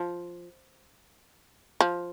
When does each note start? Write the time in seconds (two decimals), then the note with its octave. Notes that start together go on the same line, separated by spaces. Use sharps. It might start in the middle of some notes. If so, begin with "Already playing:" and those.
Already playing: F3
1.81 F3